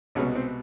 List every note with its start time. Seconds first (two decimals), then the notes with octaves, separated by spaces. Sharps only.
0.15 C2 B2 G#3 B3 C#4
0.35 C4